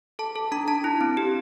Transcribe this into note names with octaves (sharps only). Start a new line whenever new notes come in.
A4 A5
A4
D4 A#5
D4 A5
E4
C4
G4